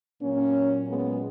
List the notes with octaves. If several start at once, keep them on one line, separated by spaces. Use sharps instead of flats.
A#2 F#3 A#3 C#4
G#3 B3